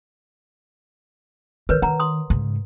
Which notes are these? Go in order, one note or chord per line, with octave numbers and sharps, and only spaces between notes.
D#3 A#4 B4 C#5
D#3 F#5 A#5
C6 D#6
G#2 C#3